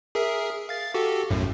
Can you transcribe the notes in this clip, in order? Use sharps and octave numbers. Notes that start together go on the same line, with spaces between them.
G#4 A#4 E5
F5 A6
F#4 G4 A4
B1 F#2 A2